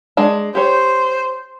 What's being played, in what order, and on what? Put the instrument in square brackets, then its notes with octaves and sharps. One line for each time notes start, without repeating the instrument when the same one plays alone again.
[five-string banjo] G#3 D4 A5
[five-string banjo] G4 C#5 [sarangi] C5